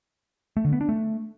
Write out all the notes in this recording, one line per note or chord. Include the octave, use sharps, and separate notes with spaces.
A3
D3
B3
D4
A3